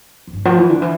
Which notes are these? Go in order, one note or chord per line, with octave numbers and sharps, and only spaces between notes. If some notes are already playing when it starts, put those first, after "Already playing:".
F2
G2
F3
E3
D3
E3